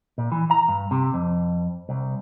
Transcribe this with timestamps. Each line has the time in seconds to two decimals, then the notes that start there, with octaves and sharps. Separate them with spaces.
0.18 A#2
0.32 E3
0.51 A#5
0.69 G2
0.91 C3
1.14 F2
1.89 C2